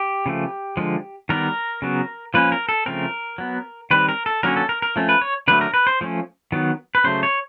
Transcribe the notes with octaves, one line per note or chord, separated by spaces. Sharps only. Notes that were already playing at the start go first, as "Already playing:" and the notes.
Already playing: G4
C#3 F3 A3
D3 F3 G#3
D#3 G3 B3 A#4
C#3 F#3 B3
F3 A#3 C#4 B4
A#4
A4
C#3 F3 A3 C4 A#4
F#3 B3
D#3 G3 C4 B4
A#4
A4
D3 F#3 A#3 C#4 A#4
A4
A#4
A#4
F3 A3 C#4
B4
C#5
D3 F#3 A3 B4
A#4
B4
C5
F3 A3 C#4
D#3 F#3 B3
B4
C#3 F#3 A3 C5
C#5